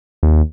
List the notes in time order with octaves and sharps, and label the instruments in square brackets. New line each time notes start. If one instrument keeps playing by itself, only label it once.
[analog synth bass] D#2